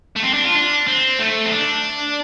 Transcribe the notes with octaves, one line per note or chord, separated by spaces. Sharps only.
A3
C4
D4
F4
D4
C4
A3
C4
D4